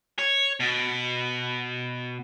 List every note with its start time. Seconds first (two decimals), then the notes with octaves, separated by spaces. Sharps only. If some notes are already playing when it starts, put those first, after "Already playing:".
0.19 C#5
0.60 B2